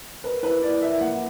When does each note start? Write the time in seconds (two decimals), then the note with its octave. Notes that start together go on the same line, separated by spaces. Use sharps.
0.24 A#4 B4
0.43 E4 B4
0.62 E4 D5
0.82 A#4 E5
1.01 A#3 F#5